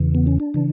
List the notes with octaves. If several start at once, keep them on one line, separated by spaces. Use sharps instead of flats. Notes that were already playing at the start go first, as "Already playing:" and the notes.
Already playing: E2 C#3 E3
B3
C#4
D4
C#3 E3